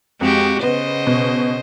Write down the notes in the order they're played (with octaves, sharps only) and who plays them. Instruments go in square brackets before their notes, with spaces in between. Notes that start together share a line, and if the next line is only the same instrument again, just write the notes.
[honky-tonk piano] F2 [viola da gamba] G#3 F#4 G4
[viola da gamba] C#3 C5 D#5 [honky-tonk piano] B3
[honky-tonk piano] B2